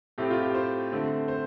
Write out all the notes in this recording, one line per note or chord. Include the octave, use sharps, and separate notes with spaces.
A2 A3 C4 G4
F4
G4
C5
D3 A3 C4
C5